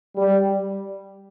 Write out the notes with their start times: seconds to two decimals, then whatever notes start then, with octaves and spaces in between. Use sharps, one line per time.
0.16 G3